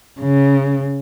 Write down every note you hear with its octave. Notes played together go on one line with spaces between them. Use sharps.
C#3